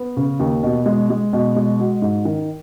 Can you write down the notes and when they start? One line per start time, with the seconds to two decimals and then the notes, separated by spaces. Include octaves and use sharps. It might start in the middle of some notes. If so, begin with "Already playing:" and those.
Already playing: B3
0.17 C#3
0.40 D#2
0.63 B2
0.86 G#3
1.10 G#3
1.33 B2
1.56 G#3
1.79 F#4
2.02 G#2
2.25 D#3